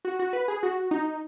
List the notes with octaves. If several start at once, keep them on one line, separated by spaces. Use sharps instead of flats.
F#4
F#4
B4
G#4
F#4
D#4